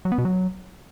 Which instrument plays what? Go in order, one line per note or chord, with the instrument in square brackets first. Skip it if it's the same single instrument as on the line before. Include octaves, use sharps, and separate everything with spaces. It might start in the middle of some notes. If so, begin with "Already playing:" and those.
[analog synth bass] F#3
B3
B2
F#3